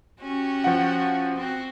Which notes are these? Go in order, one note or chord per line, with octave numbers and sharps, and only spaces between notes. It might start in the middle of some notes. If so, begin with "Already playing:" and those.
C#4 F#4 G4
F3 F#5
C4 F#4